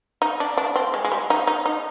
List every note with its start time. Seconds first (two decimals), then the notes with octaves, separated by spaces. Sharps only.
0.22 D#4
0.40 D4
0.57 D4
0.76 C4
0.94 G#3
1.05 G#3
1.12 G3
1.30 D#4
1.47 D#4
1.66 D#4